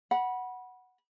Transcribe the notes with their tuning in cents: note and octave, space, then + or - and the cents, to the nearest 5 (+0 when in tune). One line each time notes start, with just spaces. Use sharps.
F#5 +0 B5 -25